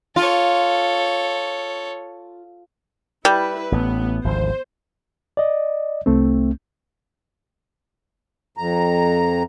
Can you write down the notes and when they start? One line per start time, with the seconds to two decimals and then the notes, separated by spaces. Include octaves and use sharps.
0.16 F4 A4 C#5
3.25 G3 E4 B4
3.72 A1 A2 B3
4.24 G#1 D2 F3 C5
5.37 D5 D#5
6.06 C2 A3 C4
8.58 F2 A#5